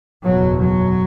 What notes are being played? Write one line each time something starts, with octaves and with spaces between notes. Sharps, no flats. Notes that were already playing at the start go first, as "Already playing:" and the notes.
F#1 E2 B2 F#3
F#3